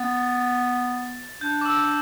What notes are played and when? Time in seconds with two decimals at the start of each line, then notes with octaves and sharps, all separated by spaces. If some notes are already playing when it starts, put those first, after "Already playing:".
Already playing: B3 A6
1.41 D4 G6
1.61 D6
1.65 E6